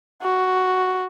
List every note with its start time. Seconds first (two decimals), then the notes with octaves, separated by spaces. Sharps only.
0.22 F#4